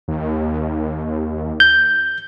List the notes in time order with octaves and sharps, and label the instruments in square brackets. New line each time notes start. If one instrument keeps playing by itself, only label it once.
[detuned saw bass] D#2
[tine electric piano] G6